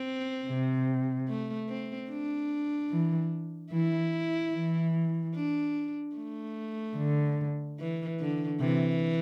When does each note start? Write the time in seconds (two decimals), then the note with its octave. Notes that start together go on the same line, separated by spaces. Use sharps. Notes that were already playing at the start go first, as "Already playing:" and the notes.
Already playing: C4
0.47 C3
1.28 A3
1.69 C4
2.09 D4
2.91 E3
3.72 E3 E4
4.53 E3
5.35 D4
6.16 A3
6.97 D3
7.79 E3
8.20 D3
8.60 C3 E3